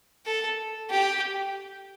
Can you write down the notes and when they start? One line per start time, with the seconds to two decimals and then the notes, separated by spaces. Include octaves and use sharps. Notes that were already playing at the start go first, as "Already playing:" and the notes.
0.26 A4
0.90 G4